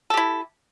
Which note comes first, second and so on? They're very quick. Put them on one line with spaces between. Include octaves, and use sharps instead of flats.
A4 G4 E4